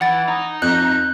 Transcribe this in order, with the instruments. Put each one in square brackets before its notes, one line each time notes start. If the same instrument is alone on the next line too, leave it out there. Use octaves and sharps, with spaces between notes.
[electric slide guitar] E3 [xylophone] F#5 A6 D7
[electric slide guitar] D#4
[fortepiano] F2 [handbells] F#6 G6